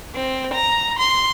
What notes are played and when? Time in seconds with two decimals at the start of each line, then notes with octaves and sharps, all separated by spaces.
0.15 C4
0.54 A#5
0.99 C6